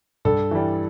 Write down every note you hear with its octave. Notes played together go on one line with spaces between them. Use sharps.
G2 A4
E3 G3